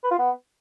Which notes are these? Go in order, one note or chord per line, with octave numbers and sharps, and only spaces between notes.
B4
F4
B3